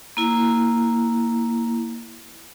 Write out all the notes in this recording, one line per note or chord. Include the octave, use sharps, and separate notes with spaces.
A#3 E4